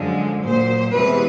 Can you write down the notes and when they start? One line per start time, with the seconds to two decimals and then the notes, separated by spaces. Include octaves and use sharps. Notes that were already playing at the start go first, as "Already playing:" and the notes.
Already playing: F#2 D3 F3 G#3
0.42 A#2 F#3 C5
0.94 E2 C3 E3 G#3 B4